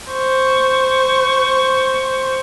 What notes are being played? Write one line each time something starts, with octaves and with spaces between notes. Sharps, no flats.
C5 C#6